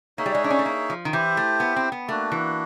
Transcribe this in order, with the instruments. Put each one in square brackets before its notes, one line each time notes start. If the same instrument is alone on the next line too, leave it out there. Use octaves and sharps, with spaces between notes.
[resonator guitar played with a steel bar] A#3 [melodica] D#4 G#4 C#5 E5
[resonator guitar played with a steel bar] G3
G#3
D4
C#4
A3
A#3
F3
D#3
[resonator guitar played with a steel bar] E3 [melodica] E4 G4 C5
[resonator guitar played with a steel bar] A3
B3
C4
B3
[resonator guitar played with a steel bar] A3 [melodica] A#3 D4 F#4
[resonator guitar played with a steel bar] E3